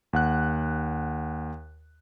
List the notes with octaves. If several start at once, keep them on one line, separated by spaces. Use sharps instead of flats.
D#2 F#5 F#6